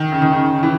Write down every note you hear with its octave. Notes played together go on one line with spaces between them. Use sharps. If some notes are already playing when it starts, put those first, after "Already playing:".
Already playing: D#3
C#3
D#3
C#3
E3